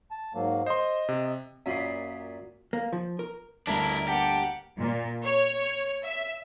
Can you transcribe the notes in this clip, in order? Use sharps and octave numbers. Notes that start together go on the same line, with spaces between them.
A5
G#2 F#3 A#3
C5 D#5 C6
C3
F#2 A#2 B5 C6 D#6
A#3
F3
A#4
G1 D2 G2 D4 E4 A#4 A5
A#3 G4 F#5 A5
A#2
C#5
E5